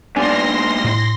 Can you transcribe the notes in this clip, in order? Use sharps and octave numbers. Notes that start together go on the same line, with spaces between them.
G2 A#2 B3 D4 G#5 C6 A#6
A2